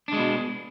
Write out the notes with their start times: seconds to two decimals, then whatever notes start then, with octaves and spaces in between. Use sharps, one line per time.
0.08 D4
0.13 G#3
0.17 B2